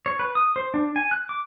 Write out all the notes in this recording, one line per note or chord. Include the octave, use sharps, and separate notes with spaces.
C#5
B4
D#6
C5
D4
G#5
F#6
D6